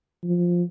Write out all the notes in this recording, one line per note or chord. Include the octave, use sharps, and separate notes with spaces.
F3